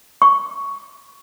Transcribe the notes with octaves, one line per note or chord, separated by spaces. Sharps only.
C#6